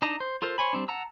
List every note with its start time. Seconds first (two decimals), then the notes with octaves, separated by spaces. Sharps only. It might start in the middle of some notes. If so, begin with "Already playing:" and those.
0.02 D4 D#4 D#5 A5 A#5
0.20 C5
0.42 F4 A4 A#4 C5
0.58 C5 C#5 G#5 B5
0.73 G3 C4 D4
0.88 F#5 A5 A#5 E6